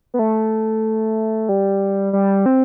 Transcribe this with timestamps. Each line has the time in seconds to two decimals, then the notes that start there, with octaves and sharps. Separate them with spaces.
0.14 B3
0.19 A3
1.49 G3
2.13 G3
2.46 C4